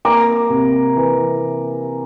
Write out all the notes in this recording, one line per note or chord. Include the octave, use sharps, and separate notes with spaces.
A#3 A#5 D6
C3
E3